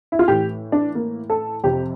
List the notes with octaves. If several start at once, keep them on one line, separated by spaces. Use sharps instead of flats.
E4
F4
A2 E3 G4
D4
A#3
A4
F2 C3 F3 G4